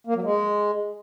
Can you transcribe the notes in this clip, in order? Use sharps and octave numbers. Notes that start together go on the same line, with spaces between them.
A#3
F#3
G#3